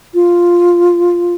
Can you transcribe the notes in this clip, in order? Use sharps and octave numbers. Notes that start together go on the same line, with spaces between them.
F4